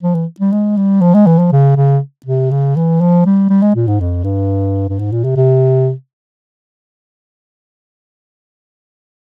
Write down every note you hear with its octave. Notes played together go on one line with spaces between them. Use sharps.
F3
E3
G3
G#3
G3
F3
G#3
E3
F3
C#3
C#3
C3
C#3
E3
F3
G3
G3
G#3
A#2
G#2
F2
G2
G2
G#2
A#2
C3
C3